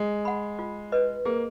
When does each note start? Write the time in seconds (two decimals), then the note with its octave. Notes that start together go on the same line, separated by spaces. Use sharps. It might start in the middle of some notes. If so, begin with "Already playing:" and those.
Already playing: G#3
0.25 F#5 B5
0.59 F4
0.92 B4 D#5
1.25 A#3 G#4